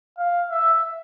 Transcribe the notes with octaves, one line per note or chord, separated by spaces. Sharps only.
F5
E5